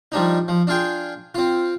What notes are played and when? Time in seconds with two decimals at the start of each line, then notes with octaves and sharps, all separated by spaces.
0.12 F3 G3 D4 D#4
0.48 F3
0.67 D4 F4 G#4 G5
1.35 C4 F4